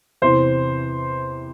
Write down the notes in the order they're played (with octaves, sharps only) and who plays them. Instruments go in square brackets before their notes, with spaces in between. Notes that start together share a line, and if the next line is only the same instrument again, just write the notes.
[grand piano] E2 C3 E3 C5